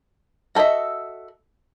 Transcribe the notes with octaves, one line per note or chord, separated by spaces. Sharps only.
F#4 A4 B4 D#5 E5